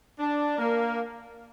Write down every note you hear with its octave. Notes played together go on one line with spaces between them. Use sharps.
D4
A#3